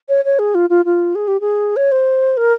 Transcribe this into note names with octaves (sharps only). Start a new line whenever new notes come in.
C#5
C#5
G#4
F4
F4
F4
G#4
G4
G#4
C#5
C5
A#4